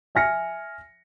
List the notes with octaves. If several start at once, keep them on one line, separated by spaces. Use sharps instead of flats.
E5 G#5 F6 A#6 C#7